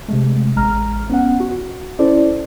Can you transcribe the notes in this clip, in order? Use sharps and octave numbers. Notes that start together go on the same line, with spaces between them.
C3 G#3 A3
A1 G#3 A#5 F6
B3 C#4 F#5
F#4
C#4 E4 A4 C5 D5